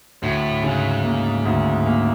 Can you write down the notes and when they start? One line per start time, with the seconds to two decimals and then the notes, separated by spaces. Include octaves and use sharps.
0.22 D2 A2
0.63 G#2 C#3
1.04 A#3
1.45 D2
1.86 A#3